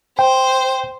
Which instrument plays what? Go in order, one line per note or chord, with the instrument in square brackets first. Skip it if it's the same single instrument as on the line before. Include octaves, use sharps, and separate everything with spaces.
[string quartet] C5 [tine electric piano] G5